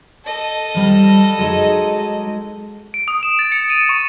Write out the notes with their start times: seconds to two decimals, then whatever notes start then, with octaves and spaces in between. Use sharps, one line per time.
0.24 A4 D#5
0.75 F3 G3 F5
1.38 F#3 G#3 D#4
2.94 D7
3.08 D#6
3.23 E7
3.39 A6
3.52 C#7
3.70 D#7
3.89 C#6